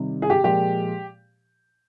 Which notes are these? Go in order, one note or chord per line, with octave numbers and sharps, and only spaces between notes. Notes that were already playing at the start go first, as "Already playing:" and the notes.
Already playing: C3 D#3 G3
G#4
G4
A#2 F3 G#3 G4